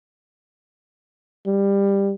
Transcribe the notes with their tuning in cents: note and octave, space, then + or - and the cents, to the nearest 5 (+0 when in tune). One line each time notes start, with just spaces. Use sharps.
G3 +15